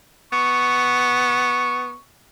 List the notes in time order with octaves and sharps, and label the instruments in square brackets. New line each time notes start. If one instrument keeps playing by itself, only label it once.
[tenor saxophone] B3 [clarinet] C#6